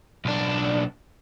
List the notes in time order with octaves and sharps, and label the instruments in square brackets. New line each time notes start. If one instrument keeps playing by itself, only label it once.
[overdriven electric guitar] B1 D4